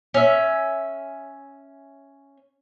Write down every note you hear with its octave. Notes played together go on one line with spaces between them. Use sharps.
C#4 E5